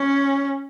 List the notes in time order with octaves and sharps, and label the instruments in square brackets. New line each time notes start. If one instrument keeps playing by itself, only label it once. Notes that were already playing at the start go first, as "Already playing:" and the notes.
Already playing: [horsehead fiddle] C#4